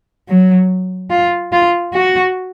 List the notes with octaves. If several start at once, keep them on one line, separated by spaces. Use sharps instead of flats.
F#3
F4
F4
F#4